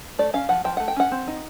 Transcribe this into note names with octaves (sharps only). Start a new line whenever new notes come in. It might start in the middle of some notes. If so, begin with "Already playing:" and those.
A3 D5
C#4 F5
F3 F#5
F3 G5
A3 F#5
G5
C#4 F#5
C4
D#4